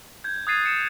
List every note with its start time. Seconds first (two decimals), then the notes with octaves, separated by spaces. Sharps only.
0.24 G6 G#6
0.47 D#6 F#6 G#6 A6 C7 D#7
0.63 C7 C#7 E7